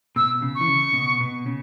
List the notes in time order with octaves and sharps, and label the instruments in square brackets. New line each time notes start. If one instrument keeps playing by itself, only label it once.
[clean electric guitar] B2 [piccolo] E6
[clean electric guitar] C#3
[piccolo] C#6
[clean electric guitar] E3
C#3
B2
B2
C#3